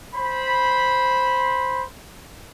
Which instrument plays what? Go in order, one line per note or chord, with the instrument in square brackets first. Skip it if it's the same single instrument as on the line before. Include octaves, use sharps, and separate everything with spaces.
[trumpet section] C5 B5